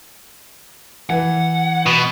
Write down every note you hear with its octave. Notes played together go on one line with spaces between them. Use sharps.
E3 F#5
B2